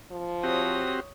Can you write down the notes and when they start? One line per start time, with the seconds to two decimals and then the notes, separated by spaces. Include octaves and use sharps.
0.11 F3
0.43 C4 F#4 G4 C#5 D#6